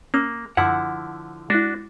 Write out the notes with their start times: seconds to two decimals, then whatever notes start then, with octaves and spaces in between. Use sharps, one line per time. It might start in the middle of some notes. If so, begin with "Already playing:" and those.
0.14 A#3 C#4 D#6 E6
0.57 F#2 D3 F3 E4 F#5
1.50 G#3 D4 E4 F#4